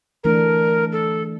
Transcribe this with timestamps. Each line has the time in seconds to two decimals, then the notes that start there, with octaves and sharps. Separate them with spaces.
0.24 E3 A3 D4 A#4
0.92 A4